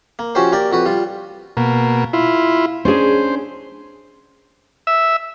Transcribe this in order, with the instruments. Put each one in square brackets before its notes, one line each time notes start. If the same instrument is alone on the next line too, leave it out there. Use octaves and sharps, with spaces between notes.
[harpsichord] A#3
F3 C#4 F#4 G4 C5
A#3 G4 A#4 D5
F2 F#4 B4
G3 F4
[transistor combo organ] B2 A#3
E4 F4
[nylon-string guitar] C#4 D4 G#4 [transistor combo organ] C5
[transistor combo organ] E5